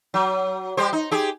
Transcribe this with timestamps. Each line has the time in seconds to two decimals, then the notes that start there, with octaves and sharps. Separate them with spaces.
0.14 F#3
0.77 G3 G4 C5
0.93 D#4
1.11 G4 G#4